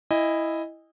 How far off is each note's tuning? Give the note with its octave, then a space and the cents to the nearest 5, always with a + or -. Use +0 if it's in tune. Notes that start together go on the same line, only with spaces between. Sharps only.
E4 +0 D#5 +0 G#5 -40